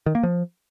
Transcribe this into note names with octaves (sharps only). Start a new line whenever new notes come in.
D#3
A#3
F3